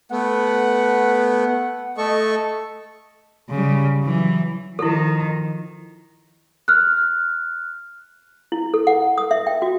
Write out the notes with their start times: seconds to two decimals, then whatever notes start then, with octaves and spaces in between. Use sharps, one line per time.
0.12 A3 B3 F#5
1.98 A3 A4 D#5 C#6
3.49 C#3 G3
4.03 E3 F#3
4.79 D#3 F3 E4 A4
6.68 F6 F#6
8.52 E4
8.74 A4
8.87 F#5
9.18 D#6
9.31 E5
9.47 G5
9.62 F#4